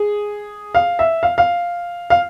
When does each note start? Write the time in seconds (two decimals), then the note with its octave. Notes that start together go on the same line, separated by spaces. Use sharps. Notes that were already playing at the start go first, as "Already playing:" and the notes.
Already playing: G#4
0.75 F5
0.99 E5
1.23 F5
1.38 F5
2.10 F5